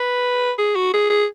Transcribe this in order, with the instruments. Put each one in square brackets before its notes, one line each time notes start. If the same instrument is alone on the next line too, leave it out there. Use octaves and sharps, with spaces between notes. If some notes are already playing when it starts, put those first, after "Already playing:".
Already playing: [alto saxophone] B4
G#4
F#4
G#4
G#4